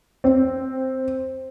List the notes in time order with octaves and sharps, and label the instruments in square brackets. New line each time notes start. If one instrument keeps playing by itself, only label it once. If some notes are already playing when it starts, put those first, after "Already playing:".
[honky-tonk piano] C4